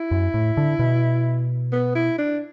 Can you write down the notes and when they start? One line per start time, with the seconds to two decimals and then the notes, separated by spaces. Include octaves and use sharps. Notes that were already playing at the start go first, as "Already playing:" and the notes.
Already playing: E4
0.11 F#2
0.34 A2
0.57 D3
0.79 B2
1.72 B3
1.95 E4
2.18 D4